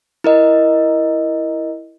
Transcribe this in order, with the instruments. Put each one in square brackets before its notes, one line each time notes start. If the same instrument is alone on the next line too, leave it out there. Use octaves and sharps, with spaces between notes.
[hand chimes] E4 A#4 D#5